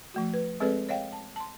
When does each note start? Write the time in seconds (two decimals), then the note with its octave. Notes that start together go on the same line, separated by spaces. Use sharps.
0.14 F3 A3 F#4
0.33 B4
0.60 G#3 C4 G#4 A4 B4 D5
0.89 C#5 D#5 F5 G5
1.12 A5
1.36 A5 C6